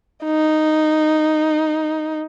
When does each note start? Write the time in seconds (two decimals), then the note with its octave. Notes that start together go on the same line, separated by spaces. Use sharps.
0.25 D#4